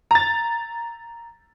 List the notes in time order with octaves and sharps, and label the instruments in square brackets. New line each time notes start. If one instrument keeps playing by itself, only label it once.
[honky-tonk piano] A#5 A6